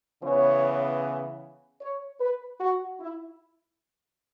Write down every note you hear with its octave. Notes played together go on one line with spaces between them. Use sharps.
C#3 E3 B3 C#5
C#5
B4
F#4
E4